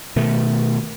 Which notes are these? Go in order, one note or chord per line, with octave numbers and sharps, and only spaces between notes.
B2 D#3 A3